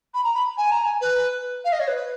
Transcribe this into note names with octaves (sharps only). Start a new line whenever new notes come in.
B5
A#5
B5
G#5
A#5
G#5
B4
F5
D#5
C#5
B4